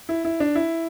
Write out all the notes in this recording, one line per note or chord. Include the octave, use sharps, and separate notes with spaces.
E4
E4
D4
E4